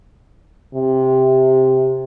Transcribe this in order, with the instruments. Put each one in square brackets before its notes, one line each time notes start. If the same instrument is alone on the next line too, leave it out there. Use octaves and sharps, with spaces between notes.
[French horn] C3